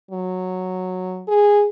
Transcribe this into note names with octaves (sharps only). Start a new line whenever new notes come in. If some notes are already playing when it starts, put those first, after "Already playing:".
F#3
G#4